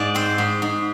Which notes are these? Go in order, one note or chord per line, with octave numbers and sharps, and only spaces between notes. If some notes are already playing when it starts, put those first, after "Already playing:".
Already playing: G#2 D5
C4 C5
G#2
G#2